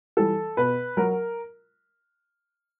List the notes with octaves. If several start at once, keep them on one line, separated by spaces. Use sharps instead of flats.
E3 G3 A4
B2 B4
F#3 A#4